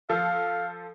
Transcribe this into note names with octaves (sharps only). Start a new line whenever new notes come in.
F3 A4 F5